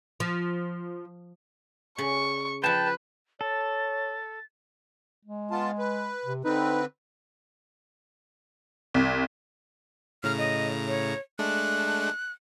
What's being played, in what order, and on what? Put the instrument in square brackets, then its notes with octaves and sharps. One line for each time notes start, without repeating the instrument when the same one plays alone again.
[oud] F3
[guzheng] C#3 [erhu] C#6
[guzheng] F3 F4 [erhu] B4 [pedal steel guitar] G5 A5
[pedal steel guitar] A4 [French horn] C#5 [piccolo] A6
[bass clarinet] G#3
[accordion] B3 F4 A5
B4
[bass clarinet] C3
[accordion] D3 C4 B4 [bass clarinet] D#4
[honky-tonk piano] C2
[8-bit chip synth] A2 C#3 A#5 [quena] F6
[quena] D#5
C#5
[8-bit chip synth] G#3 A3 D4 [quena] F#6